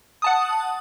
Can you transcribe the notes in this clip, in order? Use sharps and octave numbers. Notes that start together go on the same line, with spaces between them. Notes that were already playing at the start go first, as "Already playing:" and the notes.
F#5 A5 D#6